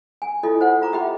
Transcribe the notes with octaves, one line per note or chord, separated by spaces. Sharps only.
G#5
E4 F4 A4 D#5
C5 F#5
F4 A#5 D6
G4 D#5 E5 G5 B5